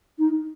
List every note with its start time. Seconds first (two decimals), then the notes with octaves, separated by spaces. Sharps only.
0.19 D#4